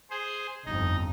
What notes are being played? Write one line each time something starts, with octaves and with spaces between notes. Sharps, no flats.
G#4 C5
G1 F2 D#4 D#5